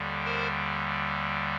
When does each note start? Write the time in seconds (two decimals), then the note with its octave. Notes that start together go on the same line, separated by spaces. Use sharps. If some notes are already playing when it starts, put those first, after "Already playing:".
Already playing: D#2 D3 G3
0.25 A#4 C5